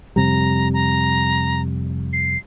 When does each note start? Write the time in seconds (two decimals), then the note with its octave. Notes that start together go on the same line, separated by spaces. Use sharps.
0.16 F2 C3 G3 A#5
0.74 A#5
2.13 C7